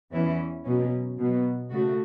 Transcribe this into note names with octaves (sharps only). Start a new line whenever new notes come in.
E2 E3 C#4 E4
B2 F#3 C#4
B2 F#3 B3
C#3 A3 F#4